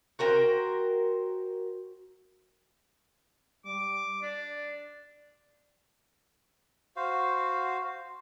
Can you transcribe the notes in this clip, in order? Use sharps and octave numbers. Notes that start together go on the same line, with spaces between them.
F#4 A#4 C5 G5
G3 D6
D4 D5
F#4 C5 F5